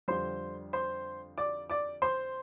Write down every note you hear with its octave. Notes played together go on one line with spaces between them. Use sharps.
F2 D3 G3 C5 C6
C5 C6
D5 D6
D5 D6
C5 C6